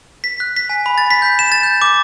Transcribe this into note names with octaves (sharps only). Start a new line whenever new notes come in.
B6
F#6
B6
G#5
B5
A6
B6
G6
E7
A6
G6
D6